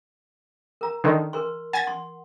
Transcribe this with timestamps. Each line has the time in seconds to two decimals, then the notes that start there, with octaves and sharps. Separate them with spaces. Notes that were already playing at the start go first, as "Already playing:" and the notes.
0.81 A#4 A#5
1.04 D3 D#3
1.33 A#4 B4 C6
1.73 F#5 G#5 G#6 A6
1.87 C6